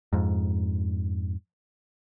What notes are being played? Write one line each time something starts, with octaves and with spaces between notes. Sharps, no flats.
F2 G#2